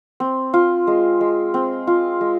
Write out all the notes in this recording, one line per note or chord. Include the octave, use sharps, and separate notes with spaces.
C4
F4
G#3
G#3
C4
F4
G#3